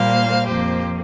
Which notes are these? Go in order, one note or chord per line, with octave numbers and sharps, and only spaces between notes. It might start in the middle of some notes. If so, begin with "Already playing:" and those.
Already playing: A#2 G3 A#3 C5 F5
F2 F3 A#3 G4 C5